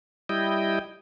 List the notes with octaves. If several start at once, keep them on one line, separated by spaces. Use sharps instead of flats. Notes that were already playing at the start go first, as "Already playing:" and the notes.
G3 E4 D#5 G5